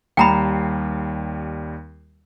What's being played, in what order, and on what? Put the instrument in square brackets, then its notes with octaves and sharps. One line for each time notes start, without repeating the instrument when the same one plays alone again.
[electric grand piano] D#2 G3 C7 [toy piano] G5 A#5 B5